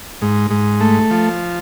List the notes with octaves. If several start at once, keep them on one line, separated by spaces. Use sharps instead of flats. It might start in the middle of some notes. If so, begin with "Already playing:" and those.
G#2
G#2
A3
F3